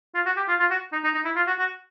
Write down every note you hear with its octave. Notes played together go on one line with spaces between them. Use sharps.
F4
F#4
G4
F4
F4
F#4
D#4
D#4
D#4
E4
F4
F#4
F#4